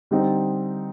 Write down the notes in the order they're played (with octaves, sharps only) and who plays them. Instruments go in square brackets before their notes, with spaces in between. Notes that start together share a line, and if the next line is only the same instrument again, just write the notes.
[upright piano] D3 G3 C4 D#4